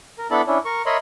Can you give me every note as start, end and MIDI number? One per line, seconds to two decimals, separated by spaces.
0.18 0.27 70
0.31 0.41 59
0.31 0.41 62
0.31 0.41 64
0.31 0.41 69
0.31 0.41 81
0.31 0.41 83
0.47 0.58 61
0.47 0.58 62
0.47 0.58 64
0.65 0.82 70
0.65 0.82 85
0.86 0.97 70
0.86 0.97 73
0.86 0.97 75
0.86 0.97 76
0.86 0.97 83
0.86 0.97 84